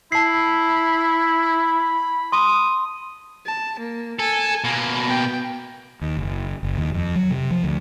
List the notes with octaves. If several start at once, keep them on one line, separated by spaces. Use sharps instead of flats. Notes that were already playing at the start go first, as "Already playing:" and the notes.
E4 A5 B5 C7
C6 D#6
A5
A#3
A4 G#5
B2 A#3
B3 G5
D#2
F#1
F#1
D#2
F2
F#3
C3
F3
D2